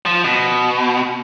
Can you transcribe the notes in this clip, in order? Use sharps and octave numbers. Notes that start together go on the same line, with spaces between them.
F3
B2